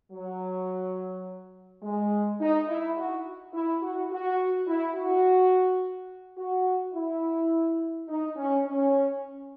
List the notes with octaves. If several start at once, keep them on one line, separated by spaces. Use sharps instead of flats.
F#3
G#3
D#4
E4
F#4
E4
F#4
F#4
E4
F#4
F#4
E4
D#4
C#4
C#4